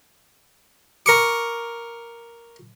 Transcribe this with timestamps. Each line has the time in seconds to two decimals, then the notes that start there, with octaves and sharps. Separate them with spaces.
1.06 A#4 C#6 D6